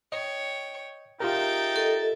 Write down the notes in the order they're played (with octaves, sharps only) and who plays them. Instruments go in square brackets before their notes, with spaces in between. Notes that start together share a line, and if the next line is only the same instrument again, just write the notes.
[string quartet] C#5 G5 [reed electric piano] D#5
[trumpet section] D#4 G#4 G5 [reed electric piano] F4 G4 A#4 [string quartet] E5 A6
[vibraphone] A4 D#5